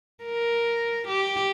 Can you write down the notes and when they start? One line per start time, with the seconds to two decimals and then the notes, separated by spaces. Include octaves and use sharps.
0.24 A#4
1.08 G4